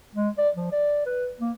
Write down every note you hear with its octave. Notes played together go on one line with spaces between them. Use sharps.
G#3
D5
F3
D5
B4
A#3